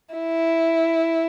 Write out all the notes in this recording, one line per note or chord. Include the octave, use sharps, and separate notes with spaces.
E4